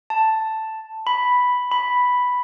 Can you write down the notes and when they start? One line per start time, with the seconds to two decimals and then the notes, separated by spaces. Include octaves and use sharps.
0.10 A5
1.07 B5
1.72 B5